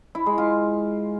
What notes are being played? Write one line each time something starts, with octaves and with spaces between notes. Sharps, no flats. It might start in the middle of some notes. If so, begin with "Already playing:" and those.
E4
G#3
F4